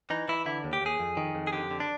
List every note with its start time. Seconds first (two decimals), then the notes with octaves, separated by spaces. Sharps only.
0.10 E3 D#4
0.28 E3 E4
0.46 D3 E4
0.64 D#2
0.73 G4
0.81 D#2 G#4
0.99 F2
1.17 D#3
1.35 F2
1.47 G#4
1.53 D3 G4
1.71 D3
1.80 D4